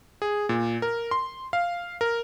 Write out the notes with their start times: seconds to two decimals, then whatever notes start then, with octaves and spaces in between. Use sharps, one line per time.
0.22 G#4
0.49 A#2
0.82 A#4
1.11 C6
1.53 F5
2.01 A#4